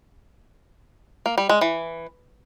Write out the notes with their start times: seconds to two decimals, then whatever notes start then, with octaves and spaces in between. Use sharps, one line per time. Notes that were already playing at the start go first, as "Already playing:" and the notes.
1.26 A#3
1.38 G3
1.49 G#3
1.61 E3